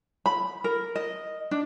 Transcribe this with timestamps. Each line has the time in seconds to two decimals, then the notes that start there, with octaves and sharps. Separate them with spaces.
0.26 B5
0.64 A#4
0.96 D#5
1.51 D4